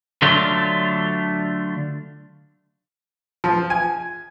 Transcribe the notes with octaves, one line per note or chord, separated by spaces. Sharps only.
D3 F#3 A3 D4 F4
F3
G#5